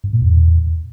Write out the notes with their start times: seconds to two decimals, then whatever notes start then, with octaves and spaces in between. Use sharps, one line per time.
0.04 G2
0.13 A#2
0.22 E2